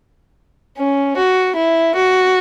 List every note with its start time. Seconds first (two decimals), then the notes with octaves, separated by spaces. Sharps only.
0.78 C#4
1.17 F#4
1.56 E4
1.95 F#4